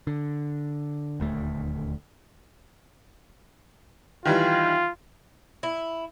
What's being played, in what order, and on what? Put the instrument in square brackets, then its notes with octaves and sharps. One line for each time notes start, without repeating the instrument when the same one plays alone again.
[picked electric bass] D3
D#1 D2 A3
[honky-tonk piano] D#3 E3 G3 [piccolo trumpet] F4
[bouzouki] E4